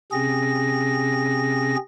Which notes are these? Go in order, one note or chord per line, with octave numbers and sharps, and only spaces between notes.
C3 C4 C#4 G#4 A#6